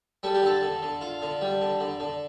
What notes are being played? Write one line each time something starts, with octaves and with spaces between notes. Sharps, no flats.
G3 A4
G4
D3 A4
D3
D3
F4
D3
G3
D3
D3
D3